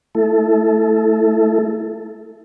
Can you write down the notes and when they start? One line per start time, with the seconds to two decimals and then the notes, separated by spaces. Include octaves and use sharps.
0.15 A3 E4 A4